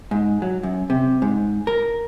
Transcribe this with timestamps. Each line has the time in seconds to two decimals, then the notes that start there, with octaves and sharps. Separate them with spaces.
0.11 G#2
0.42 F#3
0.63 F#2
0.90 C3
1.22 G#2
1.67 A#4